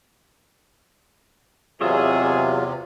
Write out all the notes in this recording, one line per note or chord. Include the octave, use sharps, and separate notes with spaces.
E2 C3 F#3 F4 G#4 C#5 D#5 E5